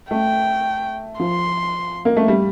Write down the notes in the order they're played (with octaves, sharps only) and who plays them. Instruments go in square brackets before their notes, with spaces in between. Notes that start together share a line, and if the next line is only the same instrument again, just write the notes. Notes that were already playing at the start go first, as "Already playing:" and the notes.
[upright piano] A3 [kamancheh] G5
[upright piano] F3 [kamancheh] C6
[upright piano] A#3
A3
G3